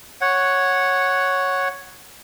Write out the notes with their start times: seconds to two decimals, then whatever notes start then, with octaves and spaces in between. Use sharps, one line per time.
0.21 C#5 F#5